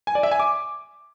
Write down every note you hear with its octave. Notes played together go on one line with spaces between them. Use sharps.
G#5
D5
E5
G#5
D6